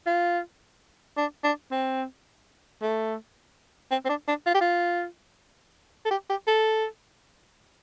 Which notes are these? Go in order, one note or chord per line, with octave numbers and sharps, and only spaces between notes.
F4
D4
D4
C4
A3
C4
C4
D4
D4
F4
G4
F4
A4
G4
G4
A4